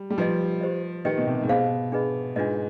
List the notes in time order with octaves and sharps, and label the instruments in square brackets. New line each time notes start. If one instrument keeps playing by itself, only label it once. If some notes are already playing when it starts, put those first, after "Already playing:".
Already playing: [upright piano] G3
G3
[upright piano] F3 [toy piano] D#4 B4 D#5
[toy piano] G4 C5 D#5
[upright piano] D#3 [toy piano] G4 B4 D#5 G5
[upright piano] B2
C3
G#2
[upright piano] B2 [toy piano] G#4 C5 F5
[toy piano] D4 G#4 B4 D#5 B5
[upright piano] G#2 [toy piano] D4 F4 B4 D#5